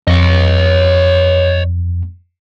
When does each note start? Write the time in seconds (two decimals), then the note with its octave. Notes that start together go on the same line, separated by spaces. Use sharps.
0.07 F2 C#5 D#5